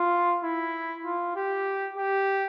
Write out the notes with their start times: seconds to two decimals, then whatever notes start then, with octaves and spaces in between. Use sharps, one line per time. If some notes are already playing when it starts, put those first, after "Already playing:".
Already playing: F4
0.44 E4
1.05 F4
1.36 G4
1.97 G4